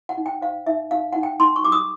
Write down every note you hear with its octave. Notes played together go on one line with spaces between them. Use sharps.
F#5
D#4
G5
C5 F5
D#4 E5
D#4 F5
D#4 F#5
G5
D#4 C6
C#6
G4 D6
D#6